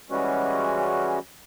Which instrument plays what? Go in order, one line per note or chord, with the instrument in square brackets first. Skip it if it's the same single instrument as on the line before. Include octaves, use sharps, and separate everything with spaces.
[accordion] E3 G3 G#3 C#4 F#4